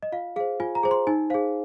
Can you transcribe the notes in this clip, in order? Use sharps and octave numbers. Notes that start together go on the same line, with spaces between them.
D#5
F4 F5
G#4 C5 F5
F4 G#5
A#5
G#4 C5
C6
D#4 G#5
G#4 C5 F5